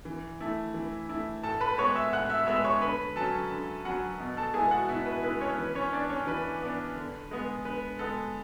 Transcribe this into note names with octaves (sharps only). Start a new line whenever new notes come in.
E3
A3 E4
E3
A3 E4
A2 A4 A5
B4 B5
G#3 B3 C#5 C#6
E5 E6
A2 F#5 F#6
E5 E6
G#3 B3 E5 E6
C#5 C#6
D3 B4 B5
F#3 C#4 A4 A5
D3
F#3 C#4 F#4 F#5
B2
A4 A5
G#3 B3 E4 G#4 G#5
F#4 F#5
B2 E4 E5
B4
G#3 B3 E4 B4
C#4 C#5
E3 B4
C#4 C#5
B3 D4 D5
C#4 C#5
E3 B4
B3 D4
D3
G#3 B3
D3 B4
G#3 B3 A4